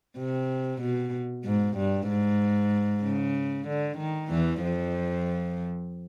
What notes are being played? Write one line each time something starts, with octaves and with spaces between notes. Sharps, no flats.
C3
B2
G#2
G2
G#2
C#3
D3
D#3
E2 E3
F2 F3